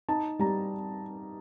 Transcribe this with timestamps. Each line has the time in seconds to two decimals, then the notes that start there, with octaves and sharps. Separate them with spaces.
0.09 D#4 A5
0.39 G3 A#5